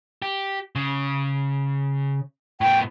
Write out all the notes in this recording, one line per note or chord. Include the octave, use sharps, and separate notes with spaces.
G4
C#3
A2 B3 G5